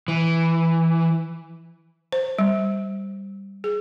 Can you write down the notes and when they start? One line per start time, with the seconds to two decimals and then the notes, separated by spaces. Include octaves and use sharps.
0.08 E3
2.12 C5
2.39 G3
3.64 G#4